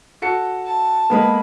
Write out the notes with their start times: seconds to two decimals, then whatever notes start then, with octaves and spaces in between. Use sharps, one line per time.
0.22 F#4 A4 C#7
0.66 A5
1.10 G#3 A#3 B3 A4 B5